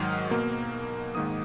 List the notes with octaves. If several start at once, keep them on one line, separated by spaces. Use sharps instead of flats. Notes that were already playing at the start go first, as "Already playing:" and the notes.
Already playing: G#2 D#3 F#3 D#6 F6
B2 A#3
G#2 D#3 A#3 D#6